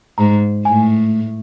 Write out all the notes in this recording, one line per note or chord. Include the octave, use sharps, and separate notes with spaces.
G#2 A#5
A2 G#5